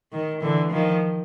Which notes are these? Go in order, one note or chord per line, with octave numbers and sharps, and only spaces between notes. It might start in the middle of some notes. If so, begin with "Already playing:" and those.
D#3
D3 E3
D#3 F3